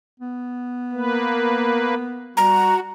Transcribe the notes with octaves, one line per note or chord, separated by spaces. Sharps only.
B3
A#3 B4
G3 F#4 A#5